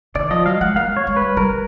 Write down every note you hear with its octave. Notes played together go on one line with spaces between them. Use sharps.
D#3 D5
F3 D#5
F#3 F5
G#3 F#5
A#3 F5
C#5
G#3
B4
G3
G3 A#4